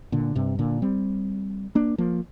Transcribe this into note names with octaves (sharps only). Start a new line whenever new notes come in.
A#2 D3
G2 C3
A#2 D3
G3 C4
A#3 D4
F3 A#3